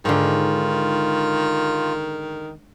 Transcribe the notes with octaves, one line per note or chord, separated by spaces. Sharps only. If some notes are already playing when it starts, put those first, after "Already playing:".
G#2 D3 D#3 F4